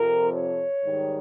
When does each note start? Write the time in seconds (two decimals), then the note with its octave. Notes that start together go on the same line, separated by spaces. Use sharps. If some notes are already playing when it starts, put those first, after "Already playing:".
Already playing: F2 C3 F3 A#4
0.32 C#5
0.85 G#2 D#3 G3